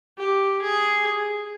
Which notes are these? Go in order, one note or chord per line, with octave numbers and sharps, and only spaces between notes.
G4
G#4